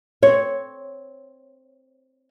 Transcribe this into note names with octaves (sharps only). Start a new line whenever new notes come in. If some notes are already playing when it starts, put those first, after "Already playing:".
C4 C#5